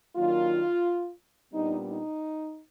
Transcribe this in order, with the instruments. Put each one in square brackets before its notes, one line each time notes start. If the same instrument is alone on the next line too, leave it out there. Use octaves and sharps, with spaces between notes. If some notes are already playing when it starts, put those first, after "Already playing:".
[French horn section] D#3 F#3 A#3 D4 F4
A#2 G3 B3 D4 D#4
D#4